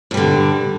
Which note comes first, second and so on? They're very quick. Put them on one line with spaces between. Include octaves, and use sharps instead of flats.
G2 G3 D3